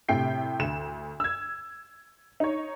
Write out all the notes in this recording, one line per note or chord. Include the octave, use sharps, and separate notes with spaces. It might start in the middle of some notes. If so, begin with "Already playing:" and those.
A2 C3 G5 C7
D2 E7
E6 G#6
D#4 C#5